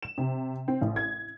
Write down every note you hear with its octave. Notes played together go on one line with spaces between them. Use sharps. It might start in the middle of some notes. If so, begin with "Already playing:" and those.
E7
C3
C4
A1
G#6